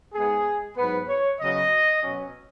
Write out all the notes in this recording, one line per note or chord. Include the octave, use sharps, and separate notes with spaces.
G#2 G#3 B3 G#4
G#2 F#3 B3 B4
C#5
C#3 F#3 B3 D#5
B2 F#3 C#4